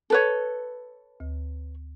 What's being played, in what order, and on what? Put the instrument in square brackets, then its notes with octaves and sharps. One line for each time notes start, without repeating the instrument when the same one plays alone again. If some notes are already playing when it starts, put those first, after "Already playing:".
[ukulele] A4 B4 C#5
[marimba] D2